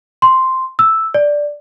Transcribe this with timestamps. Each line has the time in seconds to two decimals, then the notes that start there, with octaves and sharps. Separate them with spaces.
0.22 C6
0.79 E6
1.14 D5